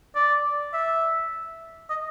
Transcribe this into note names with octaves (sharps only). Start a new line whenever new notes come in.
D5
E5
D#5